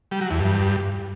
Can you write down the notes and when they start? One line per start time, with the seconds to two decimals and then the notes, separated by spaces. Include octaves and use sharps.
0.11 G3
0.21 F#3
0.31 E2
0.40 G2